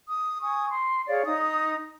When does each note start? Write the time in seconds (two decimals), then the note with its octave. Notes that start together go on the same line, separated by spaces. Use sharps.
0.07 D#6
0.42 G#5 C#6 D#6
0.69 C6
1.08 G#4 C#5 D5 F5
1.24 D#4 D#6